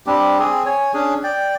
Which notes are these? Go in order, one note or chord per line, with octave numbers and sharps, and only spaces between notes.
G3 C4 D4 G4
C4 G#4
C#5 G#5
C#4 D4 G#4
D5 G5